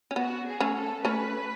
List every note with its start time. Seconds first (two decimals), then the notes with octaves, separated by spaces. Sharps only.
0.11 C#4
0.16 B3 F#4
0.46 G#4
0.60 A3 C#4
0.75 A4
1.04 A3 C#4 B4